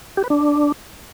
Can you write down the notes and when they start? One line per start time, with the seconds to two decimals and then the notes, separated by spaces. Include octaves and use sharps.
0.17 G4
0.24 B4
0.30 D4